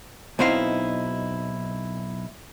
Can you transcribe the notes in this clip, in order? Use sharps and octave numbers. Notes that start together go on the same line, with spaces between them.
B1 B2 C4 D#4 E4 F5